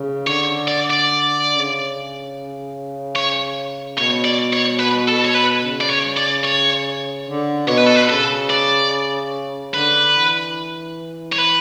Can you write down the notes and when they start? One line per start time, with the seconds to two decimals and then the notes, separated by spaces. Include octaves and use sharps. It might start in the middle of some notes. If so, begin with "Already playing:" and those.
Already playing: C#3
0.27 D3 C#5
0.68 D5
0.90 D5
1.51 C#3
3.16 C#5
3.97 B2 C#5
4.24 D5
4.53 C#5
4.79 B4
5.08 A4
5.25 C#5
5.34 B4
5.62 C#3
5.81 D5
5.90 C#5
6.17 D5
6.45 C#5
7.27 D3
7.68 B2 C#5
7.77 B4
7.86 A4
7.96 B4
8.09 C#3 A4
8.50 D5
9.73 D3 B4
10.14 E3
11.32 C#5
11.38 B4